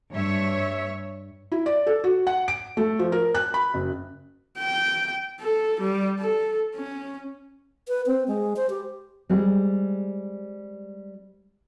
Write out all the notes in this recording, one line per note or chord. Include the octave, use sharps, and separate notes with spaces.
G2 C#5 E5
E4
D5
A4
F#4
F#5
D7
A3
F3
A#4
F#6
B5
F#1
G5
A4
G3
A4
C#4
B4
C4
G#3
C5
G4
G3 G#3 C4